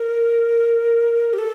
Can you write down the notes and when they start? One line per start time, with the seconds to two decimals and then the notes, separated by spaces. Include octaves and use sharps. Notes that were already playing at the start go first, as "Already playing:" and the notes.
Already playing: A#4
1.33 G4
1.38 A4